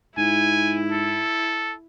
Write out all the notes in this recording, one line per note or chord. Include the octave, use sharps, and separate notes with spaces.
G#2 E4 G#5
A4